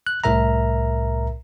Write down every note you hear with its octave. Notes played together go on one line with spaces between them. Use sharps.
F#6
C2 A2 A#4 E5 A#5